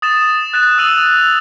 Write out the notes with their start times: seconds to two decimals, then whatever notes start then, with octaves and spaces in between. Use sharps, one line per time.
0.02 D#6 A6 E7
0.53 F#6 A6 E7
0.78 D#6 E6 D#7 F7 F#7